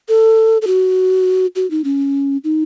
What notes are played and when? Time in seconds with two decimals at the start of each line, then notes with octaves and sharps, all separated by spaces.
0.08 A4
0.62 A4
0.67 F#4
1.55 F#4
1.71 D#4
1.84 C#4
2.44 D#4